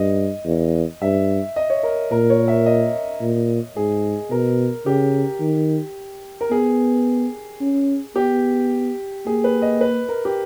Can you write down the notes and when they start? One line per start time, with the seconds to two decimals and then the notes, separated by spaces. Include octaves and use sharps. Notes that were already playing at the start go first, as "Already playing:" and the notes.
Already playing: G2 D#5
0.46 E2
1.02 G2 E5
1.56 D#5
1.70 C#5
1.83 A#4
2.11 A#2 A#4
2.30 C#5
2.48 E5
2.66 D#5
3.21 A#2
3.77 G#2 G#4
4.31 B2 A#4
4.86 C#3 G4
5.41 D#3
6.41 A#4
6.50 B3 G#4
7.61 C#4
8.16 B3 G4
9.26 A#3 G#4
9.44 B4
9.62 D#5
9.81 B4
10.09 A#4
10.25 G4